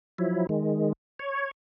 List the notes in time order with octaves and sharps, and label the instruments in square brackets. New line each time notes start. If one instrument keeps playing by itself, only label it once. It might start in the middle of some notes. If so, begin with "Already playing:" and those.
[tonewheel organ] F3 F#3 E4
D#3 G#3
C#5